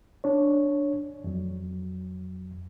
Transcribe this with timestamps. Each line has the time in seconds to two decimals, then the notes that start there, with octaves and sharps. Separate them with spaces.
0.24 D4 C#5
1.24 F2 F#3